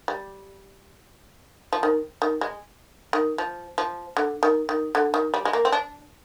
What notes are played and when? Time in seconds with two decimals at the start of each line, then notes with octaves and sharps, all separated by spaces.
0.08 G3
1.73 F3
1.83 D#3
2.22 D#3
2.41 G#3
3.13 D#3
3.38 F3
3.78 F3
4.17 D3
4.43 D#3
4.69 D#3
4.95 D3
5.14 D#3
5.34 G3
5.45 G#3
5.53 A#3
5.65 C4
5.72 D4